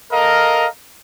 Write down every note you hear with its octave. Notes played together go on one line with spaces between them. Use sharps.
A4 A#4 D#5 F5 A#5